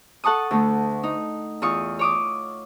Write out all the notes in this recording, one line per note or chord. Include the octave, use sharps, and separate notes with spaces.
A4 F#5 A5 C#6 D#6
D2 A3
D#4
E2 F4 C#6 D#6
C#5 D6 D#6